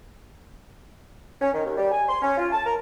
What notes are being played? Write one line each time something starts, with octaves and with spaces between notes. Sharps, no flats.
C#4
D#3
D#2
G3
G#5
C6
C#4
F4
A5
A#4